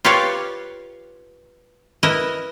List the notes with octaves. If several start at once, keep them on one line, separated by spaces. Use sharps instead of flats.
F4 G4 B4 C#5 D5 F5
E4 A#4 B4 D#5